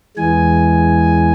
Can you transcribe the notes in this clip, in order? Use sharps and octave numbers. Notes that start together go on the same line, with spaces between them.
E2 E3 G#3 G#5